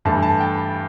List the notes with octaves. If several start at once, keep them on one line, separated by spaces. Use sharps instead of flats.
G2 E3 A3 A5
A5
G5